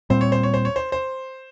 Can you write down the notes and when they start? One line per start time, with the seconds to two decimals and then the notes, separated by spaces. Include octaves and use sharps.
0.10 A#2 G3 C4 C5
0.21 C#5
0.32 C5
0.43 C#5
0.54 C5
0.65 C#5
0.76 C5
0.92 C5